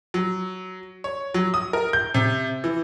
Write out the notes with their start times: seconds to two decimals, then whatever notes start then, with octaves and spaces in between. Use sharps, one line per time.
0.14 F#3
1.04 C#5
1.34 F#3
1.54 D#6
1.73 A#4
1.93 G6
2.14 C3
2.64 E3